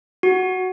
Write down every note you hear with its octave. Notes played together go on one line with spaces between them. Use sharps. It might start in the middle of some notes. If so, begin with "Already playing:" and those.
F#4